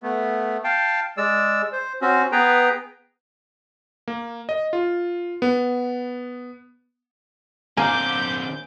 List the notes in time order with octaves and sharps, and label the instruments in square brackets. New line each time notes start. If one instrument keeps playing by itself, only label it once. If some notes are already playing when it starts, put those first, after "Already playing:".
[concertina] A3 B3
F5 G5 A5
G#3 D5 E6
C5
C4 C#4 F#4
B3 G#4 B4 G5 A#5
[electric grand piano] A#3
D#5
F4
B3
[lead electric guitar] D3 C4 [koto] A#3 [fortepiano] G#5 [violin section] D6 G6